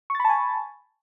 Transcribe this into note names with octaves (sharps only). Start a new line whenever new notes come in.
G#5 A5 B5 C#6 A6